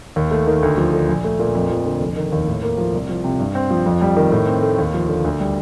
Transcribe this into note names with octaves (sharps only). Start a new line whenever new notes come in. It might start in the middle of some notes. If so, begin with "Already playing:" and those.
D#2
A3
D#3
D2
F3
D3
A#1
A3
A#2
F2
F3
D3
F1
D#3
D#2
A2
A#3
F3
C2
F3
C3
G2
C4
F3
F2
G3
D#3
A2
C4
A3
D#2
F3
D3
D2
G3